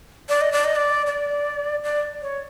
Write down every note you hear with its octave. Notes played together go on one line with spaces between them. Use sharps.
D5
D#5
D5
D#5
D5
D5
D5
C#5